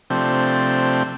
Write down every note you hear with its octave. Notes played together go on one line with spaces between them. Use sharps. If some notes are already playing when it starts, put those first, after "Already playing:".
C3 F3 A3 C4 D4